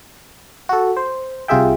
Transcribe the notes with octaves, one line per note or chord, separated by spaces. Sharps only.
F#4 A4
C5
C2 C3 F4 G#4 E5 G5